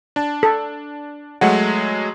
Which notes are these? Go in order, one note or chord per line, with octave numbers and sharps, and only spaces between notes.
D4 A5
A4
F#3 G#3 A3 F#5